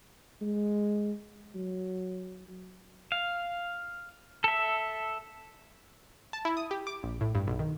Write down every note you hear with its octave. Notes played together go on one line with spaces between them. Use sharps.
G#3
F#3
F5
A4 E5
A5
E4
D#6
G4
D6
A#1
A2
G2
B1
D#3